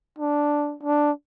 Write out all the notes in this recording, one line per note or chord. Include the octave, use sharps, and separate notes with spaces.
D4
D4